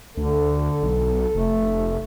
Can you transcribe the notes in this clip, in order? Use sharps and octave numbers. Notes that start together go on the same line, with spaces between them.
D2 D3 A4
B1
F1 A3